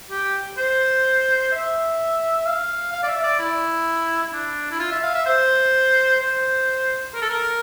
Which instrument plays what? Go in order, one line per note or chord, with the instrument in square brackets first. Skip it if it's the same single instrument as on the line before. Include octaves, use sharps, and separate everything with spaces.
[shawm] G4
C5
E5
F5
F5
D5
E5
D5
E4
E4
D4
E4
F4
E5
F5
E5
C5
C5
A#4
A4
A#4